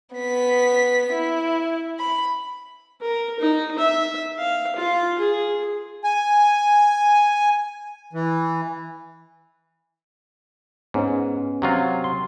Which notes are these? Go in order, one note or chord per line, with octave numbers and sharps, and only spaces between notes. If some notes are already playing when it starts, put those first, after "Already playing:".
B3 B6
E4
B5
A#4
D#4
E5
F5
F4
G#4
G#5
E3
G#2 B3 C#4
C3 F#3 F4
C6